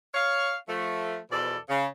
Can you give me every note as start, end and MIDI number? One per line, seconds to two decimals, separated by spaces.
0.14 0.54 73
0.14 0.54 77
0.69 1.18 53
0.69 1.18 57
1.31 1.57 40
1.31 1.57 47
1.31 1.57 53
1.31 1.57 69
1.31 1.57 74
1.69 1.86 49